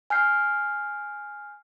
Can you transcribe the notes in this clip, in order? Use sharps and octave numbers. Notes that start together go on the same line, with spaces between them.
G#5 F6 G6 C7